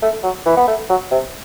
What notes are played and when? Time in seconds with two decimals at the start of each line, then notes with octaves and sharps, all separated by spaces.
0.02 A3
0.23 F#3
0.46 E3
0.57 B3
0.67 A3
0.89 F#3
1.11 C3